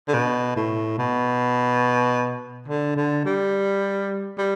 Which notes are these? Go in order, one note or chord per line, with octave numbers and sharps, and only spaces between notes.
D3
B2
A2
B2
D3
D3
G3
G3